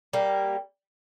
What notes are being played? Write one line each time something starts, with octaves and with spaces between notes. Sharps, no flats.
G3 A#3